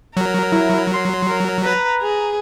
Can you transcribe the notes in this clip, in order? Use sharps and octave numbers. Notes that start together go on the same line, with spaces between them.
F#3 A#4
E4
C6
A#4
B4 A#5
G#4